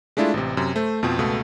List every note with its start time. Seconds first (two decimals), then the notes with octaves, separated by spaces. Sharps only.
0.17 G#3 A3 D4 E4 F4
0.34 A1 C3
0.57 F#2 C3
0.75 A3 C5
1.03 F2 B2 F3 C4
1.19 C#2 B2 A3